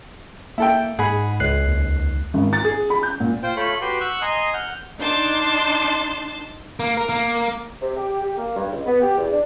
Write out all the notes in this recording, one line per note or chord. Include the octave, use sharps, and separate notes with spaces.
A#3 E4 A4 G5
G#2 G#4 F#5 B5
C#2 F#6 C7
D#2
G#1
A6
G#4
B5
G6
A#2
F4 C5 G5
A3 F4 A4 C#5 B5
F#4 G4 B4 G5 C6
F#5 C#6 E6 F#6
D#5 G#5 A#5 C6 D#6
F#5 F6 G6
D4 D#4 A5 C6
A#3
A#4
A#3
C3
G4
G4
A#3
G2
C#2
B3
G4
E2
D4